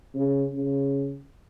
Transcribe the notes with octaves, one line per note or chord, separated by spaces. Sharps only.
C#3
C#3